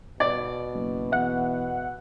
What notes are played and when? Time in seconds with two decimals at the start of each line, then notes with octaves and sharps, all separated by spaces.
0.20 B2 D5
0.74 F#1
1.12 E2 E5 F#5